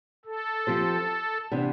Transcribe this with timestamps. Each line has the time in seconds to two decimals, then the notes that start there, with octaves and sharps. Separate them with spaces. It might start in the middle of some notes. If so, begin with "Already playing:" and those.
0.25 A4
0.67 F3 C4 G4 C5
1.52 C3 E3 B3 D4